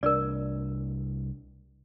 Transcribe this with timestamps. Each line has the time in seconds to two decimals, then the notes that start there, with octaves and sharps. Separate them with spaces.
0.03 C2 D4 A#4 D5